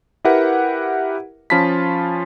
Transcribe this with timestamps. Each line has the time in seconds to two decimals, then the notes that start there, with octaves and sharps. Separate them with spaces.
0.25 E4 G4 A#4 B4 E5 F#5
1.50 F3 C#4 F4 A5 B5 B6